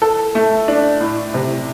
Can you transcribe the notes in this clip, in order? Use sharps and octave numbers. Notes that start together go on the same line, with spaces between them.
A4
A3
D4
A2
C3